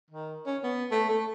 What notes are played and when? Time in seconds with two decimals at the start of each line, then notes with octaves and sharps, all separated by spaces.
0.11 D#3
0.46 C#4
0.63 B3
0.91 A3
1.09 A3